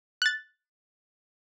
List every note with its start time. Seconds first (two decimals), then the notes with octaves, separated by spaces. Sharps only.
0.22 F#6 A6